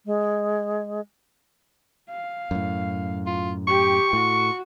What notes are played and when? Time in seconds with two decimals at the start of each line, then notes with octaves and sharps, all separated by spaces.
0.06 G#3
2.10 F5
2.51 F#2 A2
3.27 F4
3.68 G4 G5 C#6
4.13 A2 F#4